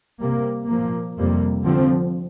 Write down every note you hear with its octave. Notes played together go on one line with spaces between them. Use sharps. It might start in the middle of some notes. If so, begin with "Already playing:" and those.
C3 G3 A#3
A#2 F3 A#3
F2 C3 G3 A#3
D3 F3 C4